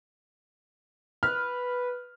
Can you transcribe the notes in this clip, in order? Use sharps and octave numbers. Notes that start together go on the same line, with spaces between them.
B4 F6